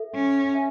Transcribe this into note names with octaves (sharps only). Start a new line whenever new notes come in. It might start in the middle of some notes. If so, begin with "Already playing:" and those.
Already playing: A4 E5
C#4
E5 G#5